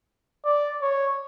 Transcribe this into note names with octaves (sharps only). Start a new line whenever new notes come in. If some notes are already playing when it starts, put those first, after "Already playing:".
D5
C#5